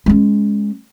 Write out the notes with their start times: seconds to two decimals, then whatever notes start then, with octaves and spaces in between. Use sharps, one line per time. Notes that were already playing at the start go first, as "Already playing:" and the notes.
0.06 G#3 C#4